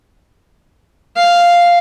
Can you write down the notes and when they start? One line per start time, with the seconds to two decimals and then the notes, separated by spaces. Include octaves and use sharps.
1.16 F5